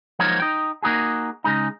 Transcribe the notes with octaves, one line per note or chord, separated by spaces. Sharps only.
F3 F#3 G#3 A#3 D#4 C#5
D#4 G5
A#3 D#4 F#4 G#4
C#3 G#3 D#4